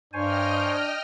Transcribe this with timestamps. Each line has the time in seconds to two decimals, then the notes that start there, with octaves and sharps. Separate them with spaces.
0.13 G2 D4 C5 C#5 D#5 G5 G#5 F6